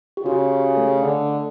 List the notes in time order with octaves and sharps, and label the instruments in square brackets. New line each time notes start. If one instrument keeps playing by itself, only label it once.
[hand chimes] G4
[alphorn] C#3 [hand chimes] F#4
[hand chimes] G4
A3 A4
[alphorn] D3